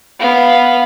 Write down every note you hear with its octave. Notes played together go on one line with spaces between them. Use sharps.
B3 F5